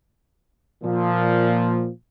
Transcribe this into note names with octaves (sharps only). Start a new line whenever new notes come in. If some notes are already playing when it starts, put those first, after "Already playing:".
A#2 F3